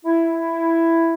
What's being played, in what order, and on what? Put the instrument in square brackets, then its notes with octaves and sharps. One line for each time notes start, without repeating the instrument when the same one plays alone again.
[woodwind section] E4